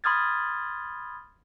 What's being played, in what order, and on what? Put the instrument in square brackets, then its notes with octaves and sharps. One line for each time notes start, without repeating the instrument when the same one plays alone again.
[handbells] B5 C6 D#6 F6 G#6 A6